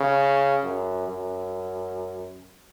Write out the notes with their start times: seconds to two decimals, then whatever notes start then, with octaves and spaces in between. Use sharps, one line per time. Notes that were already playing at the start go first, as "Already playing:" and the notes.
Already playing: C#3
0.64 F#2
1.08 F#2